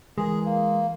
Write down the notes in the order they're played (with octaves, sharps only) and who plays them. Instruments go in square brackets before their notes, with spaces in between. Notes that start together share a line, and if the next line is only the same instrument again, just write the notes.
[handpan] E3 A#4 [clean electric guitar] G#3 [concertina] G#4
[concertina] A#3